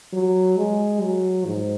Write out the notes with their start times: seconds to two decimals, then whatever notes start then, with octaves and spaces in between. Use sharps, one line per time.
0.13 F#3
0.57 G#3
1.02 F#3
1.46 G#2